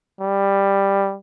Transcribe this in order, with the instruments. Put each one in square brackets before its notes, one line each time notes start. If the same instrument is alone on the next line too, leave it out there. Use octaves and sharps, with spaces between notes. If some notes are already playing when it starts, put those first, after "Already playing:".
[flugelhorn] G3